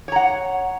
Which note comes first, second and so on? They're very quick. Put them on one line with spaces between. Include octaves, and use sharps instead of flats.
C#5 A#5 F#5